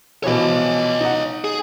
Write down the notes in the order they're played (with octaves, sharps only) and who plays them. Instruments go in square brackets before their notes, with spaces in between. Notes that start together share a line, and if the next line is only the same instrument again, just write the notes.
[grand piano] B2 E3 F3 [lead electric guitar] C#5 D#5
[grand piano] D#4 F#5
[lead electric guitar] G#4